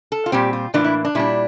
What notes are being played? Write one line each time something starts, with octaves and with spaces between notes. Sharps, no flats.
A4
F4
A#2 G3 C4 G4
F4
A2 E3 A#3 D4 F4
E4
D4
A#2 G3 D4 E4